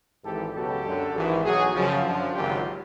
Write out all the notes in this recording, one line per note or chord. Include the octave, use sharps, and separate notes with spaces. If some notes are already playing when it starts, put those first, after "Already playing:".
G#1 G#2 E3 G4 A4
C#2 B2 F#3 G4 A4
F#2 D3 F#3
G#1 G#2 E3
B1 B2 F#3 F#4 G#4
F#2 C#3 F3
F#2 D3 F3
G#1 F#2 C#3 F#3 F4 G4